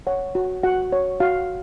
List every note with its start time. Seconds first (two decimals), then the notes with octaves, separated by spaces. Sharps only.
0.07 C#5 F#5
0.35 F#4
0.63 F#4 F#5
0.92 C#5
1.20 F#4 F5